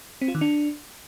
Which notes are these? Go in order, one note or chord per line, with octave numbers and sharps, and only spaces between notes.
C4
F4
D#3
D4